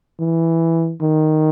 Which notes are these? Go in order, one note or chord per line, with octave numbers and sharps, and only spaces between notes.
E3
D#3